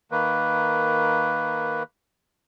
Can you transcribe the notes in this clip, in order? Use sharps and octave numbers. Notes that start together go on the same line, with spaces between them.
D#3 A#3 B4